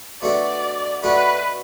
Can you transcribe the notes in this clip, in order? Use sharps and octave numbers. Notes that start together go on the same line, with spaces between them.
B2 A3 D4 F#4 A4 D5
B2 A3 D4 F#4 A4 B4